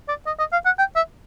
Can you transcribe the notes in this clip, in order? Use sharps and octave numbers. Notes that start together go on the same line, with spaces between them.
D5
D#5
D#5
F5
F#5
G5
E5